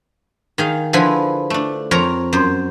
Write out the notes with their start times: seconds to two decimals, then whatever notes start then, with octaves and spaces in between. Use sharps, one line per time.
0.58 D#3 G#4 F5
0.93 D3 F3 E4 B4 G#5
1.50 A3 D4
1.91 F2 A#4 C#5 A#5
2.33 F#2 C5